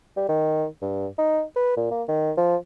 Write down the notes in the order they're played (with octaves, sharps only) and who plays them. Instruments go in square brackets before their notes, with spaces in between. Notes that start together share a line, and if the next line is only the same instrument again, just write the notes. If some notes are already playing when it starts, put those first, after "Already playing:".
[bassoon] G3
D#3
G2
D#4
B4
A#2
A#3
D#3
F3